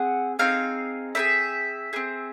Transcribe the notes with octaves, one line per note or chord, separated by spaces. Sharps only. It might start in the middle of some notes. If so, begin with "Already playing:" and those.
Already playing: C4 G#4 F#5
C4 D#4 G#4 F5
C4 D#4 G#4 E5
C4 D#4 G#4